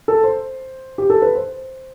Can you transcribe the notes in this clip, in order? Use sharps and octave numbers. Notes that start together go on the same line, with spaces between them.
A4
C5
G4
A4
B4
C5